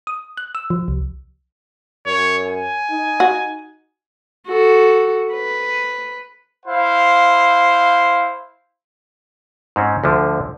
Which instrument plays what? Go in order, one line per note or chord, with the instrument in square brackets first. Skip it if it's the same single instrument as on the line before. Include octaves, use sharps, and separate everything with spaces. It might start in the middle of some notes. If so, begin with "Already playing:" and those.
[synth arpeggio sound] D#6
F#6
E6
F3
C2
[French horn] F#2 [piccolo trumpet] C#5
[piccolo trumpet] G#5
[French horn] D#4
[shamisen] F#4
[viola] F#4 A4
B4
[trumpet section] E4 C5 F5
[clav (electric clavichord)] G#2 C4 C#4
D2 D3 F3